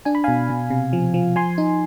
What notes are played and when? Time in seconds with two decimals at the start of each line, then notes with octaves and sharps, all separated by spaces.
0.05 D4 G#5
0.15 B5
0.24 B2 F5 G#5
0.50 B2
0.70 C3
0.93 F3
1.14 F3
1.36 F3 G#5 C6
1.58 D#4